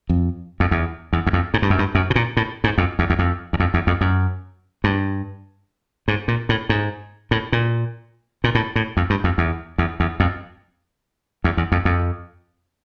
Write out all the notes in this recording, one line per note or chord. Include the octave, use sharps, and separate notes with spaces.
F2
F2
E2
E2
E2
F2
G#2
G2
F#2
G2
F#2
B2
A#2
A2
G#2
F2
E2
E2
F2
E2
F2
E2
F2
F#2
G2
G#2
A#2
A2
G#2
A2
A#2
A#2
A2
A2
F2
G2
F2
E2
E2
E2
F2
E2
E2
F2
F2